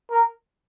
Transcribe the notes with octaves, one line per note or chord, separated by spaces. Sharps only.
A#4